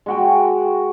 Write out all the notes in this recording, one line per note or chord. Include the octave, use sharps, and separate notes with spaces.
G#3 F#4 G5